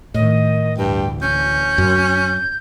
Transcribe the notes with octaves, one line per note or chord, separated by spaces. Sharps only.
A2 D#3 D#5
D2 G2 E3 G5
C#4 G6
F#2